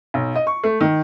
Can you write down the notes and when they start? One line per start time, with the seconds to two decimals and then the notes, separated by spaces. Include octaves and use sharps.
0.14 B1
0.35 D#5
0.47 C#6
0.64 A3
0.81 D#3